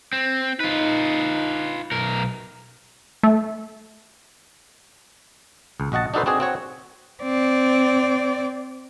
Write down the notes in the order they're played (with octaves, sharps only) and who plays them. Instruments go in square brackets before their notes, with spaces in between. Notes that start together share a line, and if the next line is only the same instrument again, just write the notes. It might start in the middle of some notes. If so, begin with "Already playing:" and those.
[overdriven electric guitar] C4
[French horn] D#4 [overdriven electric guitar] F4 B4
[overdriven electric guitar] B1 A#4
[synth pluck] A3
[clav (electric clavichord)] C#2
A#1 F#4 D#5 F#5 A5
D4 D#4 F#4 A4 B4 C5
C4 D4 F#4 G#4
C4 F#4 C#5
[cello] C4 D5